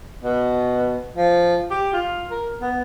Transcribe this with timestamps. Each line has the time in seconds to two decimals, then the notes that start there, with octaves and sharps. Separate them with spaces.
0.24 B2
1.16 F3
1.71 G4
1.93 F4
2.31 A#4
2.61 B3